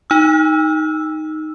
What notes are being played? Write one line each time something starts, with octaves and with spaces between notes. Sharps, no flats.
D#4 E6